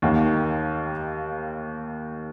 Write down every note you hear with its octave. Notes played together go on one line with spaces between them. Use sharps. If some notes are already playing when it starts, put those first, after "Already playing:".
D#2 D#3 A#3